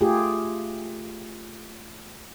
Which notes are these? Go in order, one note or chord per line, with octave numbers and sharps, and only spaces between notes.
A3 F4 G4 G#4